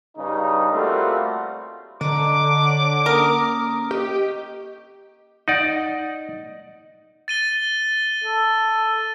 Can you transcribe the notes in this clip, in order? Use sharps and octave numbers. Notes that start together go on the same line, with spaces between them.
G2 C#3 D#4
G3 A3 A#3 C4 F4 F#4
D3 D#5 A#5 D6
C#5 F#5 C#6
A#3 C#4 A#4 D#6
G4 D#5 C#6
D#4 D5 D#5 F#5
A6 D#7 G7
A4